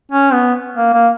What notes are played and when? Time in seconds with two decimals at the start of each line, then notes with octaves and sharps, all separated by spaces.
0.11 C#4
0.33 B3
0.77 A#3
0.93 A#3